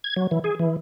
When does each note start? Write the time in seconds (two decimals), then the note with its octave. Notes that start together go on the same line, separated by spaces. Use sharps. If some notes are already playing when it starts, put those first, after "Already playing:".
0.04 G#6
0.16 F#3
0.31 E3
0.44 G#4
0.60 E3